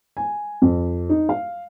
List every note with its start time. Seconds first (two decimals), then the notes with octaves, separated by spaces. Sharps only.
0.17 G#5
0.62 F2
1.09 D#4
1.29 F5